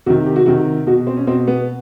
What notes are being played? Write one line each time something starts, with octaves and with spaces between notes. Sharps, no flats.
C3 D#3 F#4
G4
F#4
C3 D#3 F#4
B2 F#4
C4
C#4
B2 C4
B3